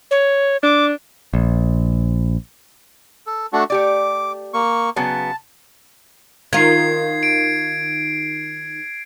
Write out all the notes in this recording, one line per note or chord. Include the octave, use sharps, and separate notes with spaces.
C#5
D4 D6
A#1
A4
A3 D4 F#4
A3 G4 D5 D6
A#3 C#6
C#3 F#3 B3 A5
D#3 F4 G#6 C7
D7